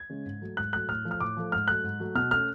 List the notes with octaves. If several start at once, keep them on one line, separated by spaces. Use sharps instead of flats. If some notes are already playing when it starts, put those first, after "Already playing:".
Already playing: G#6
C#3 G#3 C#4
G#2
F#3 A3
G#2 F#6
F#3 A3 F#6
A2 F6
F3 A3
F6
A2 D6
F3 A3
G#2 F6
F#3 A3 F#6
G#2
F#3 A3
B2 F6
A3 C#4 F6